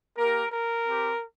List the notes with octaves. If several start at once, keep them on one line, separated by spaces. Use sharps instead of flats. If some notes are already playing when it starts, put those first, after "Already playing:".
A#3 G4 A#4
A#4
C4 G4